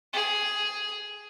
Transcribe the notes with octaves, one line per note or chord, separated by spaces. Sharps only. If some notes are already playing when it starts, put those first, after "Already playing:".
G#4